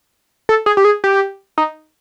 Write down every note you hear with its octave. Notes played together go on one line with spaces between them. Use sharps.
A4
G#4
G4
G#4
G4
D#4